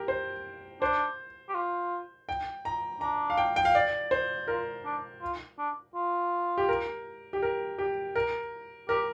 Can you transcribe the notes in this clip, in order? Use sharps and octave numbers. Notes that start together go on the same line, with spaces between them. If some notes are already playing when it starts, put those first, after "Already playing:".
Already playing: G4 A#4
C5
D4 C5
G4
F4
G5
A#5
D4 A#5
F5
G5
G5
F5
D5
C5
F4 A#4
D4
F4
D4
F4
G4
A#4
G4
A#4
G4
A#4
G4 A#4